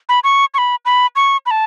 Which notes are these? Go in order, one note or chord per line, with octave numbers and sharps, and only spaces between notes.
B5
C#6
C#6
B5
B5
C#6
B5
A5